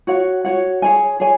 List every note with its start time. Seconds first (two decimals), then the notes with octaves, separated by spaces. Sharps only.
0.07 F#4 C#5 F#5
0.45 F#4 C#5 F#5
0.82 G#4 C#5 G#5
1.20 G#4 C#5 G#5